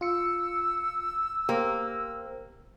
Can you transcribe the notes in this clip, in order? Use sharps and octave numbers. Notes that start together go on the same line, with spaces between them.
F4 E6 C#7
A#3 G4 C5